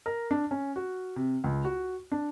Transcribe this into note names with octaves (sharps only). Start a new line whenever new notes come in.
A#4
D4
C#4
F#4
C3
C#2
F#4
D4